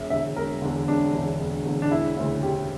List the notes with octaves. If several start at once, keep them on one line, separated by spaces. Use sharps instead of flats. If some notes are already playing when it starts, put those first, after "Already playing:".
Already playing: E1 E5
E2 D3 E5
E1 A#4
E2 D3
E1 D4
E2 D3
E1
E2 D3
D4
E1 E4
D2 C#3 E4
E1 G4